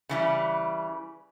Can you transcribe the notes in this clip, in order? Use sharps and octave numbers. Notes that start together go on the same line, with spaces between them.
C#3 E3 G3